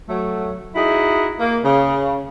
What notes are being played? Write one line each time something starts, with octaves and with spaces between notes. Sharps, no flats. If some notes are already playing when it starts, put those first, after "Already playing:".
F#3 A3
D#4 E4 F#4 G#4
A#3
C#3